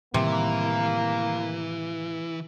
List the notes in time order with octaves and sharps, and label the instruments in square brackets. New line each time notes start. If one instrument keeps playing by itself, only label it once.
[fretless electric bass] A2 D#3 G3 [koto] C3 [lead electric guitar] E3 [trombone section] A#3